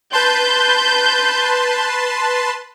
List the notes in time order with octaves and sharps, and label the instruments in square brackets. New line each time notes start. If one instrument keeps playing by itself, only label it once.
[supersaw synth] B4 A5 C6 [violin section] G6